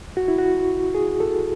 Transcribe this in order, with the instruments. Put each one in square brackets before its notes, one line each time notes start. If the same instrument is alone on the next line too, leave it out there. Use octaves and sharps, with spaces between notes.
[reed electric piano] F#4
E4
F#4
G#4
A4